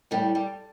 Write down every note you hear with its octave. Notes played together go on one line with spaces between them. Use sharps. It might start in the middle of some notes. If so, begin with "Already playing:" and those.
A2 G3
G3